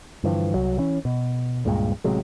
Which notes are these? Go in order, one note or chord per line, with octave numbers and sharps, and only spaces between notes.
G2 D3 E3 F3
C2 F#3
E3 C#4
B2
C#2 G2 A#2 G#3
A1 C3 F#3 G#3